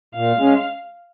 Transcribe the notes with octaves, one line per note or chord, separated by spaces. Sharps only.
A#2 F5
G#3 C#4